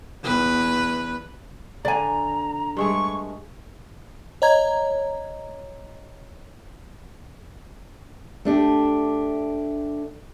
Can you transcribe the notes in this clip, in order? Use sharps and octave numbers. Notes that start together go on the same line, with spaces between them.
E2 B4
D3 D5 G#5 A#5
G2 G#3 A3 C#6
C#5 D#5 A#5 G#6
A3 D4 G4